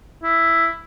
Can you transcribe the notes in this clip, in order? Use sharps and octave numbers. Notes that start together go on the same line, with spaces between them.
E4